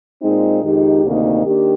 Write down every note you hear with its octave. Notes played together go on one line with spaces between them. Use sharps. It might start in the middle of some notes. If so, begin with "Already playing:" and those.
A#2 G#3 C4 D#4
F2 D#3 G#3 D#4 G4
D2 C3 D#3 A#3 D#4
D#3 A#3 D4 G4